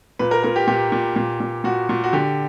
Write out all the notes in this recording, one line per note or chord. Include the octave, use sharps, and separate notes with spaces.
A#2 B4
A#4
A#2 A#4
G4
A#2 G4
A#2
A#2
A#2
A#2 F#4
A#2
F#4
D3 G4